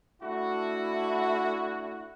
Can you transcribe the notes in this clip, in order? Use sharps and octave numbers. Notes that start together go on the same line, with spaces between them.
A3 D4 E4 F#4